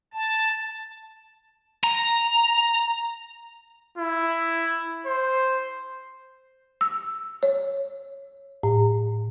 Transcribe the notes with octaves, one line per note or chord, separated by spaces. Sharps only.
A5
A#5
E4
C5
E6
C#5
A2